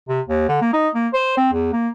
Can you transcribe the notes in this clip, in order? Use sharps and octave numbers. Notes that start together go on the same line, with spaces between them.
C3
D#2
D3
A#3
D#4
A#3
C5
C4
E2
A#3